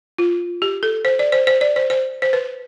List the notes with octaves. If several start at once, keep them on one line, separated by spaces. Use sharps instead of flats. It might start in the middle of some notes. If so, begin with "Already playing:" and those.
F4
G4
A4
C5
D5
C5
C5
D5
C5
C5
C5
B4